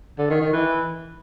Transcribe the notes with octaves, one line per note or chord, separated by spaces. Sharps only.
D3
D#3
D#3
E3